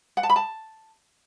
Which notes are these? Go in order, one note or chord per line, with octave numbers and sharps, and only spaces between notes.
F#5
A5
B5
A5